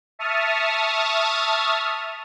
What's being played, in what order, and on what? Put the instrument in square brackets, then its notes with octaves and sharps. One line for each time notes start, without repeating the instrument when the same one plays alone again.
[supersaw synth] E5 A5 C#6 D#6 F6